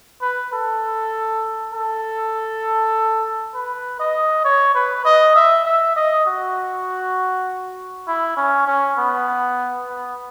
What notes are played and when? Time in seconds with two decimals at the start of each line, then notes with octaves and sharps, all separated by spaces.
0.21 B4
0.52 A4
1.73 A4
3.54 B4
3.99 D#5
4.45 C#5
4.75 B4
5.05 D#5
5.36 E5
5.65 E5
5.96 D#5
6.26 F#4
8.07 E4
8.37 C#4
8.67 C#4
8.97 B3
9.88 B3